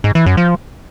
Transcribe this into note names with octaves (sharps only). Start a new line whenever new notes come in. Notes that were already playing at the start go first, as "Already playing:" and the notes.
G#2
E3
F#2
F3